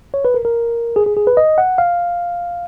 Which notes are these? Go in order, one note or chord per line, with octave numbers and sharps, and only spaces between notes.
C#5
B4
A#4
A#4
G#4
G#4
G#4
B4
D#5
F#5
F5